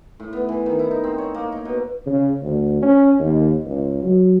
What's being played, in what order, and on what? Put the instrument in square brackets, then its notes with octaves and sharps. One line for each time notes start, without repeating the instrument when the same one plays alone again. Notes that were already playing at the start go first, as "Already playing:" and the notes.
[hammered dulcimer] A2
B3
E3
D#3
E4
D#4
C4
C#5
A#3
D#4
B2
[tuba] C#3
D2
C#4
D#2
C#2
F#3